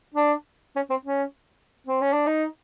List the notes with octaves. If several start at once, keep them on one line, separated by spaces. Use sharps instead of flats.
D4
C#4
C4
C#4
C4
C#4
D4
D#4